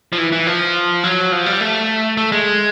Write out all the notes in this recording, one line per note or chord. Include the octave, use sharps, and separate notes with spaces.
F3
E3
E3
F3
F#3
F3
G3
A3
A3
G#3